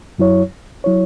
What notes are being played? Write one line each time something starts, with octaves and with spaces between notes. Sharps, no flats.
F#2 F#3 E4 C#5
F#3 E4 C#5